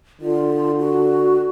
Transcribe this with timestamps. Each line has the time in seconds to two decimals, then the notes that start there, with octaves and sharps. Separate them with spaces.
0.21 D3 F4
0.79 F#4